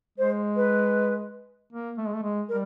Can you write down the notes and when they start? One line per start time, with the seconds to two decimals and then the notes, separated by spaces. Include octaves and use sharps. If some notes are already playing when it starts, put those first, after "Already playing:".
0.18 G#3 C5
0.56 B4
1.72 A#3
1.98 A3
2.06 G#3
2.13 A3
2.23 G#3
2.49 G3 A#4